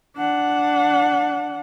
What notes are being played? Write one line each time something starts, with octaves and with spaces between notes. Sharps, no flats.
D4 F#5